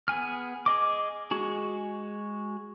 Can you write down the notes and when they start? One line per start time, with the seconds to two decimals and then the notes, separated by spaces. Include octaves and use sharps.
0.08 B3 G#4 G#5 F6
0.66 G#4 D#5 D6
1.31 G#3 F#4 G#4